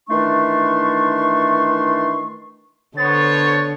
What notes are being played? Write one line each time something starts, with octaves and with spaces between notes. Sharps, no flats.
D#3 E3 A3 D4 C6 C#6
D3 B3 C5 C#5 A6